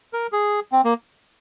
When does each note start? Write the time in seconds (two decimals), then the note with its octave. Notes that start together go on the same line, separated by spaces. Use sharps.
0.13 A#4
0.33 G#4
0.72 C4
0.84 A#3